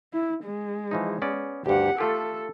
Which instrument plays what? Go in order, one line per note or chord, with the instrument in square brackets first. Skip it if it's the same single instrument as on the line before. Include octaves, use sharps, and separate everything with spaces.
[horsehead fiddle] E4
G#3
[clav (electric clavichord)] E3 F3 D#4
B3 C#4 D5
[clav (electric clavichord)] D2 G2 [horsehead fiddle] G4 F#5
[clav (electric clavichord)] A3 F4 G4 [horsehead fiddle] A4